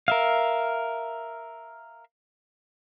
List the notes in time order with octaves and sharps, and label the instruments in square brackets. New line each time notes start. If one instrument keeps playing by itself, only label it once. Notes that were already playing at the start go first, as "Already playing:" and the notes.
[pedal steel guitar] A#4 E5 F5